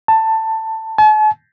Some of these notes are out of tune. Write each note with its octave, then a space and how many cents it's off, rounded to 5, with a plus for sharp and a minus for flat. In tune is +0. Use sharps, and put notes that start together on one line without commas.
A5 +15
A5 -45